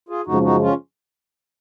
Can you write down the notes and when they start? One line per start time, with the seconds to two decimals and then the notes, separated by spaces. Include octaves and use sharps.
0.09 F4 G#4
0.26 F#2 C#3 F3 G#3 D#4 F#4
0.44 D#4 F#4
0.61 C#4 F4